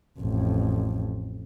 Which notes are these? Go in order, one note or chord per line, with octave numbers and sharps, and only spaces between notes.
A1 F2